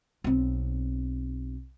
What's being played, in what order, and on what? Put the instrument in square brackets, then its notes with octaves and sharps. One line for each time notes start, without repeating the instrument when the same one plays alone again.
[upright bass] B1 C4